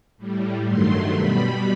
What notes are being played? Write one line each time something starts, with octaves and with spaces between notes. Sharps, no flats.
A2 G3
G2 D#3 F#3 A3 C6
B2 G3 B5